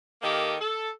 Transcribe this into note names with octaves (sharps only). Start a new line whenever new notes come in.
D#3 A#3 G4 A4 D#5
A4